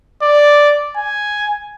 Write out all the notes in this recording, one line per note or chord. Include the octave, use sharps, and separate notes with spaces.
D5
G#5